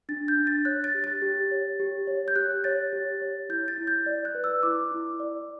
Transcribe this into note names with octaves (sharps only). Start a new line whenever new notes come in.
D4 A6
G6
D4
A6
C#5 F#6
A6
G4
A6
G4
C#5
G4
C#5
G6
G4 F#6
C#5 A6
G4
C#5
E4 G6
A6
E4
G6
D5
F#6
B4
E6
E4 D6
E4
D5